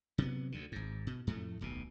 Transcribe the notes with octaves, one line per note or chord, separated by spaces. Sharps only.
C3 F#3 B3
D2 D3
G#1 G#2
B2
F2 A2 A3
D1 B1 B2